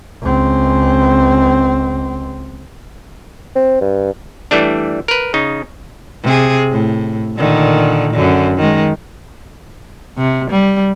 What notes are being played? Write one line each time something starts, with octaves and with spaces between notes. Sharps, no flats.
C#2 C4
C4
G2
E3 G3 A3 D4
A#4 B4
C#3 D#4
C3 G#4
A2
A#2 D3 D#3
F#2 D3
D#3 G#3
C3
G3